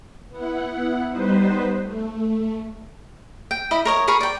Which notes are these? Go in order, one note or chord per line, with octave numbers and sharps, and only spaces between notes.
B3 E4 F#5
G3 B3 D#4 B4 C5
A3
G5
E4 D#5 B5
A#4 C#5 D#5
G#4 A#4 B5 C#6
D5 G5